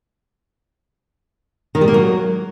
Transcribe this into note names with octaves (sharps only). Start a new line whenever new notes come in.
D#3
G3
A#3
F#3